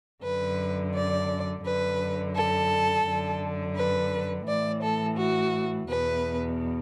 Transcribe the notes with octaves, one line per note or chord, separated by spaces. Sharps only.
F#2 D3 B4
D5
F#2 D3 B4
A4
F#2 D3
B4
A2 E3 D5
A4
F#4
E2 B2 B4